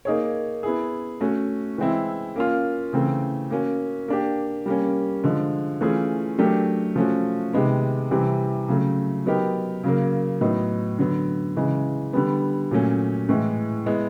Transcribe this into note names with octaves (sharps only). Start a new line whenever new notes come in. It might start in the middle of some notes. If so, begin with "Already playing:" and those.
A#3 D#4 G#4 C#5
B3 E4 G#4
A3 C#4 F#4
E3 G#3 C4 E4
A#3 C#4 F4
C#3 E3 A3 C4
A#3 C#4 F#4
A#3 D4 G4
G3 A#3 C#4
D3 F3 G#3
E3 A3 C#4 F4 G#4
F#3 A3 D4 G4 A#4
F3 A3 C#4 F#4
C3 D#3 G#3 B3
C3 E3 G3 C4
C#3 F#3 A3
F#3 B3 D#4 G4 A#4
C#3 F#3 A#3
A2 F#3 B3 D#4
D3 F#3 B3
C#3 E3 G#3
D3 G3 B3
A#2 F#3 A3 C#4
A2 E3 G#3
G#3 B3 E4